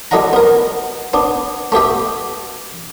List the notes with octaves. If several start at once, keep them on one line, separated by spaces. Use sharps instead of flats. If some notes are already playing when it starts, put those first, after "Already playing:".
G3 E4 A4 D#5 F#5 A#5
B3 A#4
B3 D4
A3 B3 G4 E5